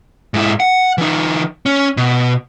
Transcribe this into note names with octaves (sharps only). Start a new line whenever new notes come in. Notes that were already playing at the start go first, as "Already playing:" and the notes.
G#2 E4
F#5
E3 D#4
C#4
B2